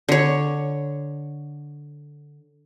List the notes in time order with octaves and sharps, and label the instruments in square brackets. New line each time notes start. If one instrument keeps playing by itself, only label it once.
[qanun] D3 C#5